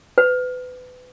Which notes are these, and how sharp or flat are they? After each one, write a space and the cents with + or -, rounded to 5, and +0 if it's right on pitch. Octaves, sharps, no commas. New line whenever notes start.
B4 +30